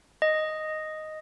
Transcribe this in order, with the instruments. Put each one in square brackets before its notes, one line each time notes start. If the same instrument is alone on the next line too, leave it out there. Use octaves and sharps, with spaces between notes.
[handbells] D#5